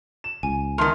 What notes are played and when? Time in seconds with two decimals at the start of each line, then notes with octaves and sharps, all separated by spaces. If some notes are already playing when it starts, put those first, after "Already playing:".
0.24 E7
0.43 C#2 G#5
0.78 E2 D#3 A5 A#5 C6 F6